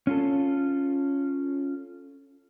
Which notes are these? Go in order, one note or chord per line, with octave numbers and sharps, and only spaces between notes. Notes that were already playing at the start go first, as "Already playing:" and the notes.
C#4 F4 A4